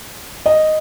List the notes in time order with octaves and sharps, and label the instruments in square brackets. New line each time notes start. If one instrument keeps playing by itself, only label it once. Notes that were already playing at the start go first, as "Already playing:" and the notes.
[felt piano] D#5